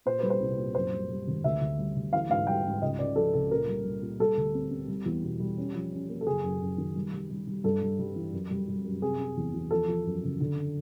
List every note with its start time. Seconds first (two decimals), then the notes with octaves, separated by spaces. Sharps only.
0.06 A#2 C5
0.19 G3 B4
0.30 C5
0.40 C2
0.58 A#2
0.75 F#2 C5
0.93 G3
1.10 G3
1.27 G#1
1.44 D2 E5
1.61 D2
1.79 G3
1.96 D2
2.12 E3 F5
2.30 G#2 F5
2.47 G3 G5
2.64 G#2
2.82 C#2 D#5
2.99 C#3 D5
3.16 F3 A4
3.33 C#2 A4
3.51 A#2 A#4
3.67 G3
3.85 G3
4.02 A#2
4.19 G3 A4
4.37 D2
4.54 C4
4.71 C4
4.88 G3
5.06 E2
5.23 B2
5.40 G3
5.58 C#4
5.75 F3
5.92 C#4
6.09 A#3
6.21 A4
6.27 F#1 G#4
6.44 F#2
6.61 F#2
6.78 D#3
6.96 G3
7.13 G3
7.29 G3
7.47 G3
7.64 G2 A4
7.82 G3
7.99 G3
8.16 E3
8.33 F#2
8.51 G3
8.68 G3
8.84 F#2
9.02 C3 G#4
9.19 C3
9.37 E2
9.54 E2
9.71 F3 A4
9.88 F3
10.06 F#2
10.23 C#3
10.40 D3